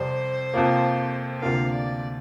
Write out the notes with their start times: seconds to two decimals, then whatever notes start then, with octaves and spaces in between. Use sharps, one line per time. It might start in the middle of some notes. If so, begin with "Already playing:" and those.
Already playing: F2 C3 G3 C5
0.54 F2 C3 F3 A#3
1.41 D2 C3 A#3 F4 A#4 F5
1.71 D5